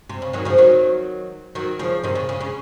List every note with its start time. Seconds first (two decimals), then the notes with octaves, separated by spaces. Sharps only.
0.09 C3
0.22 C#3
0.33 D#3 F#3
0.45 C#3 F3
0.58 D#3 F#3
1.55 D#3 F#3
1.79 C#3 F3
2.04 C3 D#3
2.15 C#3
2.29 C#3
2.41 C#3